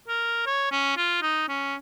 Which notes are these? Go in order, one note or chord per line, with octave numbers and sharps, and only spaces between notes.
A#4
C#5
C#4
F4
D#4
C#4